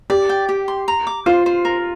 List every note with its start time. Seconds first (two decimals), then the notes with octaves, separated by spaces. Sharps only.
0.10 G4 D5
0.29 G5
0.49 G4
0.68 C6
0.88 A#5
1.07 D6
1.26 F4 C5
1.46 C5
1.65 A#4